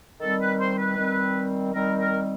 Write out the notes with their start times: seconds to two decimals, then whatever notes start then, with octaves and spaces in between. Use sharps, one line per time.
0.21 D#3 G3 C4 A4
0.40 B4
0.59 C5
0.77 B4
0.97 D#3 G3 C4
1.74 D#3 G3 C4 A#4
1.99 A#4